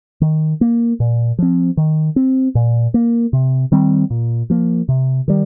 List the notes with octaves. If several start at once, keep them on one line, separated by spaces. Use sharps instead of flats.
D#3
A#3
A#2
F3 C4
D#3
C4
A#2
A#3
C3
D#3 G3 C4
A#2
F3 A#3
C3
D#3 G3